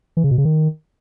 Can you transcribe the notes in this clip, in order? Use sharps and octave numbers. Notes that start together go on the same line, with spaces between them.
E3
C#3
B2
C#3
D#3